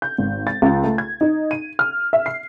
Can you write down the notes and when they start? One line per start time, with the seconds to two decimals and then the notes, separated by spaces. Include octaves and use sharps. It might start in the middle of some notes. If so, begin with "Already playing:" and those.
0.02 G6
0.18 G#1
0.47 A6
0.62 C#2
0.84 A3
0.98 G#6
1.21 D#4
1.51 D#7
1.79 F6
2.13 E5
2.26 C7